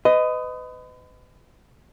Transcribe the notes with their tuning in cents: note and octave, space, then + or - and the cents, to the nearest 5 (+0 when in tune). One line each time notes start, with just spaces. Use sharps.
B4 +35 D#5 +0